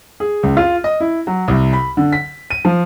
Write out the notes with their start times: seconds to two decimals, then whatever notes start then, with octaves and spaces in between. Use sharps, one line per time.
0.20 G#4
0.43 C#2
0.57 F4
0.84 D#5
1.00 E4
1.27 F#3
1.48 C2
1.73 B5
1.97 D3
2.13 B6
2.50 D#7
2.65 F3